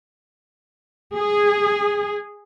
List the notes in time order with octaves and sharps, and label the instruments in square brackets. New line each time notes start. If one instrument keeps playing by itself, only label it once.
[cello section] G#4